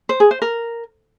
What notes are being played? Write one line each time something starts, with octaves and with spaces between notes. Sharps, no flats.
C5
G#4
C5
A#4